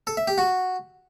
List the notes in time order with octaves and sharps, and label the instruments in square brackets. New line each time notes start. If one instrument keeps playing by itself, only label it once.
[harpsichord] A4
E5
G4
F#4